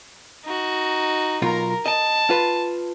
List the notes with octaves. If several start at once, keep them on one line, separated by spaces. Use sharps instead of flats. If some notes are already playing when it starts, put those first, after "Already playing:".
D#4 F#4
B1 B2 F4 A#4 A#5
D#5 A5
F4 B4